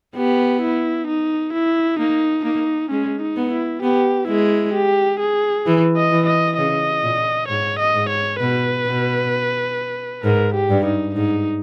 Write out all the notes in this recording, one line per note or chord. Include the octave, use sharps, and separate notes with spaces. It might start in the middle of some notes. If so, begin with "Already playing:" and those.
B3 G4
E4
D#4
E4
A#3 D#4
A#3 D#4
G#3 C#4
D#4
B3
E4
B3 G4
G#3 E4
G4
G#4
E3
D#5
E3
D#5
C#3 D#5
A#2
G#2 C#5
D#5
G#2
C#5
B2 B4
B2
G#2 A#4
G4
G2
D#4
G#2 D#4